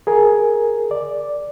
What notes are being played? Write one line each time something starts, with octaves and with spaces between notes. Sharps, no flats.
G#4 A#4 G#5
D5